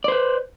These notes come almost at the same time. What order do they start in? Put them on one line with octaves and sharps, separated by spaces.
D5 C5 B4